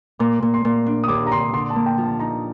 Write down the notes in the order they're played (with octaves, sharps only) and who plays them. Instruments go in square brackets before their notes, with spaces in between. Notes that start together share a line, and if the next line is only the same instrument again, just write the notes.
[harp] A#2 [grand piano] D6
[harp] A#2
[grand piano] C6
[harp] A#2
D4
[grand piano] D#6
[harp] D#2 [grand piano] D6
[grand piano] A#5
[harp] D3 [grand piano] C6
[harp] D3 [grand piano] C6
[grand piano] A5
[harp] A#3
[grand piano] G5
[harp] F3
[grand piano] A5
[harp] D#4 [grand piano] A#5